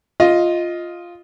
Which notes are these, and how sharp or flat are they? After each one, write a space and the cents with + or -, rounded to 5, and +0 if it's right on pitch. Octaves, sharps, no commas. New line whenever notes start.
F4 +0 D#5 +10